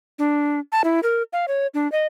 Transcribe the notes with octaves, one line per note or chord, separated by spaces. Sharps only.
D4
A5
E4
A#4
F5
C#5
D4
D#5